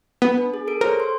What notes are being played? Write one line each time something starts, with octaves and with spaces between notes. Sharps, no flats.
B3
D4
G#4
A4 A#4 D7
A#4 C5 C#5
C6